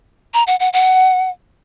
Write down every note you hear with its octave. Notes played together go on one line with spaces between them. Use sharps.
A#5
F#5
F#5
F#5